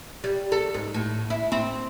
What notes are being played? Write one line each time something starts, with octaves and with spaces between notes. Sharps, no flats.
G3
A4
G#2
A2
E4
C4